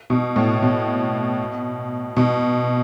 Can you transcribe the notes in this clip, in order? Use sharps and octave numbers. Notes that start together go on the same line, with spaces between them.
B2
A2
B2
B2